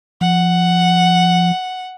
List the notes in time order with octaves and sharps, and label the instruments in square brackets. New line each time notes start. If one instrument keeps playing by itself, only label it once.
[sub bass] F3 [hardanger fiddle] F#5